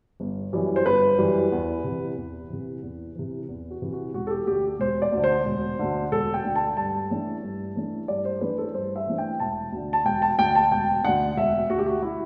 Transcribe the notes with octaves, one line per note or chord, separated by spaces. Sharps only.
G1
F#2 E3 G3
C5
G1 B4
F#2 E3 G3
E2
C3 E3
E2
C3 E3
E2
C3 E3
E2
F#4
C3 E3
F#4
E1 F#4
A4
G4
D2 D3 G4
E1 C5
D5
D2 D3
C5
E1
D2 D3
E1 A4
G5
D2 D3
A5
G2 A5
E3 A3 D4
G2
E3 A3 D4
G2 D5
C5
E3 A3 D4 B4
A4
G2 C5
E5
E3 A3 D4
G5
E1 A5
D2 D3
A5
E1 G5
A5
D2 D3 G5
A5
E1 G5
D2 D3 F#5
E1 E5
D2 D3 F#4
G4
F#4
E4